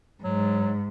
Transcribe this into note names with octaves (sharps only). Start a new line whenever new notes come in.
G#2 F#3